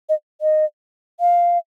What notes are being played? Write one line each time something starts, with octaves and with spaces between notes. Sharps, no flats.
D#5
D#5
F5